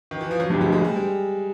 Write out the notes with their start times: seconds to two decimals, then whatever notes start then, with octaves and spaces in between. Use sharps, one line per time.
0.11 D#3
0.21 E3
0.31 F3
0.40 F#3
0.50 F3 G3 A3 D4 G4
0.61 G#3
0.72 G#3
0.85 G3
0.96 G#3